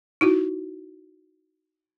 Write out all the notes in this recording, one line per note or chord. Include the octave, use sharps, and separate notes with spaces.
D#4 E4 F#4